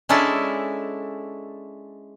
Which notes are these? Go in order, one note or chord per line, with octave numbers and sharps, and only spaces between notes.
G#3 C#4 D4 E4 G#4 A4